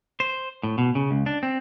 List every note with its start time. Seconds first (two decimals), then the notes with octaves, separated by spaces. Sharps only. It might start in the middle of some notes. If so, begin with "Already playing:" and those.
0.20 C5
0.63 A2
0.78 B2
0.95 C#3
1.11 C#2
1.26 D4
1.43 C4